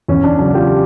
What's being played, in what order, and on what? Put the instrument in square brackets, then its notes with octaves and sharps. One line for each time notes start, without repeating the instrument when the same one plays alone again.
[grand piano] E2 C#4
D4
C#3 F#3 D4
F4 G4